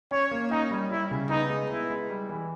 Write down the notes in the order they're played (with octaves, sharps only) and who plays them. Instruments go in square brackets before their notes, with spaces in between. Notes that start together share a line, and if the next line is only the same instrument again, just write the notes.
[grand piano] C#4 [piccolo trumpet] C#5
[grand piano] A#3
[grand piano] C#4 [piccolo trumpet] D#4
[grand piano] G3
[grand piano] G3 [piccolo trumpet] E4
[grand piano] C#3
[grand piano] B3 [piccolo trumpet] D#4
[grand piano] G#3
[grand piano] B3 [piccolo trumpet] E4
[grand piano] G#3
G3
E3